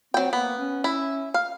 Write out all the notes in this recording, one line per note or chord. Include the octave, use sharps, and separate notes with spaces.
F#3 C4 G5
A#3 B3
C#4
E4
F5